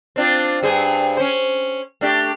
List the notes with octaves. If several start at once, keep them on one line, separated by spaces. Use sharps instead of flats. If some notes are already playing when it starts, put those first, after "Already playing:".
C4 D4 F4
G2 G#4 C5
C#4 C5
A3 D4 G4